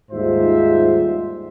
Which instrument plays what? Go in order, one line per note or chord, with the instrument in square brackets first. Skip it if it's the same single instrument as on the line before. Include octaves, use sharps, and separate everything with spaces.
[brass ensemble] D#2 G#2 G3 F4 C5 E5